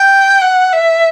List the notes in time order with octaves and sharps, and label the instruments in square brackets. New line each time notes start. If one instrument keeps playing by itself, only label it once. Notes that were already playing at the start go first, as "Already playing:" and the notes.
Already playing: [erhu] G5
F#5
E5